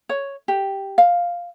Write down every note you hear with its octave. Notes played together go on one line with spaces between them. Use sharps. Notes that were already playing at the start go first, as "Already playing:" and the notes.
C#5
G4
F5